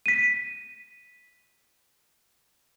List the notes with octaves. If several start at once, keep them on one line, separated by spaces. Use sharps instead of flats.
B6 D#7